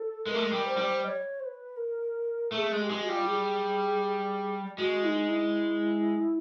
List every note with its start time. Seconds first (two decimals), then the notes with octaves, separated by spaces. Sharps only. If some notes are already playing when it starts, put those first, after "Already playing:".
Already playing: A4
0.26 G#3 B4
0.31 A3 A#4
0.42 G#3
0.52 G3
0.65 C5
0.77 G3
1.03 D#5
1.07 C#5
1.40 C5
1.44 B4
1.77 A#4
2.52 A3 A4
2.57 G#4
2.72 G#3
2.77 G#4
2.81 G4
2.90 G#3
3.03 F#4
3.06 G3 F4
3.27 G#4
4.78 G#3 F#4
5.03 E4
5.07 D#4
5.29 E4